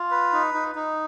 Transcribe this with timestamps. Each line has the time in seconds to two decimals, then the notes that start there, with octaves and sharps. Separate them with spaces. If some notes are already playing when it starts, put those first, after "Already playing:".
Already playing: F4
0.11 B4
0.33 D#4
0.54 D#4
0.75 D#4